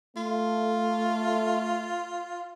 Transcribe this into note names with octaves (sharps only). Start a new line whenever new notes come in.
A3 F4